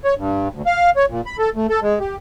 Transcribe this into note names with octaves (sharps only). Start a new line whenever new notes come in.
C#5
G2
D2
F5
C#5
A#2
B5
A4
A3
A4
G#3
G4